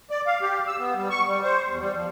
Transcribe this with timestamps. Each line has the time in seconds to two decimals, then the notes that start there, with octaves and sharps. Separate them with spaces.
0.10 D5
0.27 F5
0.41 G4
0.67 E6
0.79 B3
0.95 G3
1.10 C#6
1.26 G3
1.43 C5
1.67 E2
1.79 G3
1.95 F3